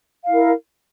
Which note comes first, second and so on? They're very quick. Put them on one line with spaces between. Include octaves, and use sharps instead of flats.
F5 E4 A#4